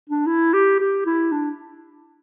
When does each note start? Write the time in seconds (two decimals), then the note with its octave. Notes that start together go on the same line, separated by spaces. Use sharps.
0.09 D4
0.26 E4
0.53 G4
0.80 G4
1.06 E4
1.32 D4